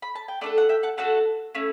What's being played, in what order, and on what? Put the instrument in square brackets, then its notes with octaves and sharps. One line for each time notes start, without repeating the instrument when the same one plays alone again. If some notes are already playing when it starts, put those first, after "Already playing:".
[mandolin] B5
A5
G5
A3 D4 A4 D5 F#5
F#5
E5 G5
F#5 A5
A3 D4 F#4 A4 F#5 A5
A3 C#4 E4